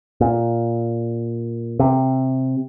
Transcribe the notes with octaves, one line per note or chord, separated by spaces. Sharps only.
A#2
C3